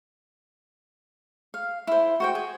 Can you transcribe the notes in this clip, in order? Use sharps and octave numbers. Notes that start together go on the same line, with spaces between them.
F5
E4 C5
F#4 C5 G5
G#4